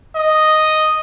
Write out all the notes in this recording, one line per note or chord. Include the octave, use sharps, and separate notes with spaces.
D#5